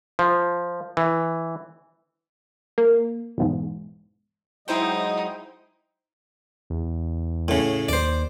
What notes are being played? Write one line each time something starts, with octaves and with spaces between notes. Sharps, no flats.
F3
E3
A#3
B1 E2 G#2
F#3 G#3 D#4 E4 C5 D#5 G5
E2
A2 C#3
D#2 C5 D5